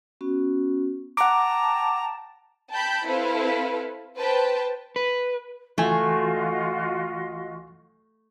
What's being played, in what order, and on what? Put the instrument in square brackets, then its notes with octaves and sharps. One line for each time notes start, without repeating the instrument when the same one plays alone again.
[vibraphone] B3 C#4 F#4
[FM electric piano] F#5 D6 [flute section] G5 A5 [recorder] A#5
[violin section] G5 A5 B5 G6
C4 E4 A4 B4 F5
B4 C5 G5 A5
[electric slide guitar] B4
[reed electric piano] C#2 E3 G#5 [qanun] A3 [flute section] F4 F#4 D#5